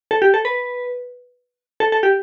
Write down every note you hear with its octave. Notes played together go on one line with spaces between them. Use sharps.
A4
G4
A4
B4
A4
A4
G4